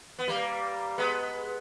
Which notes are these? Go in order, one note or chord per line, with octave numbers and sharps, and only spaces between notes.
B3
G3 A#3
G#3 B3